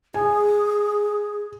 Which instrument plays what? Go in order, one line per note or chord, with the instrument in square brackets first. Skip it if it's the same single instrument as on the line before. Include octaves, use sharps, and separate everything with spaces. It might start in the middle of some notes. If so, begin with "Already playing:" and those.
[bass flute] G#4 [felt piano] G#5